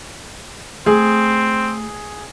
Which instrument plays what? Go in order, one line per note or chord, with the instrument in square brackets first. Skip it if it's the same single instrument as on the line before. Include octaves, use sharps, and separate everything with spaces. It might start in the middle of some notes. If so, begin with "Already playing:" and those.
[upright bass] A3 [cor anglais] C4 [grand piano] G#4